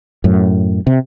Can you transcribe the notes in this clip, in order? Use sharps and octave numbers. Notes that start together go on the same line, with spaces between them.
F#2 A2
C3